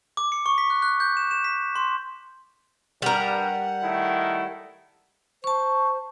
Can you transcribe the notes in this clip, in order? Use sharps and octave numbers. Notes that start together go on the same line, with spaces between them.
D6
C#7
C#6
B6
F#6
F#6
G6
E7
E7
B6
C6
G2 G3 A#4 F#5
D#3 A3 E4
C5 A5 C#6